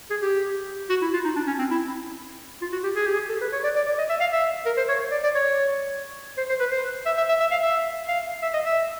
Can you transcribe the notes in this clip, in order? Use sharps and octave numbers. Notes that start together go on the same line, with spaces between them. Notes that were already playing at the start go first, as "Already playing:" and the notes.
G#4
G4
F#4
E4
F4
D#4
D4
C#4
C4
E4
F4
F#4
G4
G#4
G4
G#4
A4
B4
C#5
D5
D5
D5
D#5
E5
F5
E5
A#4
C5
C#5
D5
D5
C#5
C5
C5
B4
C5
E5
E5
E5
E5
F5
E5
F5
E5
D#5
E5